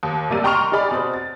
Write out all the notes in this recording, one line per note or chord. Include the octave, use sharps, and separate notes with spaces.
D#2
C3 G3 A#3 D5 D#7
G5 A#5 C6 C#6 F6 F7
D#4 G4 G#4 D5 B5
B2 C4
A6